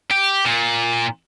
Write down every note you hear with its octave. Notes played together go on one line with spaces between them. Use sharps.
G4
A#2